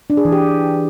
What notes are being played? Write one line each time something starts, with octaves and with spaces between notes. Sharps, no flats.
D4
G#4
E3
G4